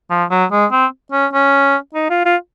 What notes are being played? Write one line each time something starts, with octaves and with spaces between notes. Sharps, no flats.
F3
F#3
G#3
C4
C#4
C#4
D#4
F4
F4